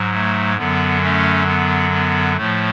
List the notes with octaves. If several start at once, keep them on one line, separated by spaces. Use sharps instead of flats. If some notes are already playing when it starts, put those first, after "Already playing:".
Already playing: G#2 F#3
A3
F#2 D3 F#3 B3
A3 C#4
B3
B3
A2 F3 A3